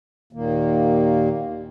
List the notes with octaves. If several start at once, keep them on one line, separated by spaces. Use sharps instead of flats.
D#2 A#2 D#3 A#3